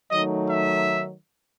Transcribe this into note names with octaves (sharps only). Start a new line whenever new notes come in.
D#3 F#3 A3 D#4 D#5
E5